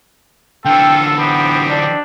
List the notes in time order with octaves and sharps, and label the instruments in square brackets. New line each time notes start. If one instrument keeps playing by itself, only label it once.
[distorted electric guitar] D3 E3 [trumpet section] F4 A4 [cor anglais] G5
[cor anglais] B3 [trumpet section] C4 D#4 G4
[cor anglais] D4